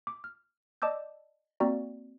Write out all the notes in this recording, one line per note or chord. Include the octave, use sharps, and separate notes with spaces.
D6
F6
D5 D#5 A5 D6 E6 G6
A#3 C4 F#4 D5 A#5